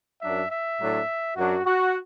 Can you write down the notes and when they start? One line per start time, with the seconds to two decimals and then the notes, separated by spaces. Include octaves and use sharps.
0.21 F#2 F#3 D4 E5
0.50 E5
0.79 A2 F#3 D4
1.36 F#2 F#3 D4 F#4
1.65 F#4